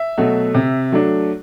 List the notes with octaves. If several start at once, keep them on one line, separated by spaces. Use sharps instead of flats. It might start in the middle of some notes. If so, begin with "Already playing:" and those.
Already playing: E5
B2 F#3 A3
C3
F#3 A3 D4